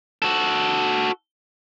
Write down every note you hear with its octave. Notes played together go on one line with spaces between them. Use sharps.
F#4 A4